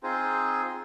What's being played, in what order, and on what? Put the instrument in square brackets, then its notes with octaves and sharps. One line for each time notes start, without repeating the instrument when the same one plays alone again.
[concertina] C4 D#4 F4 G#4 C5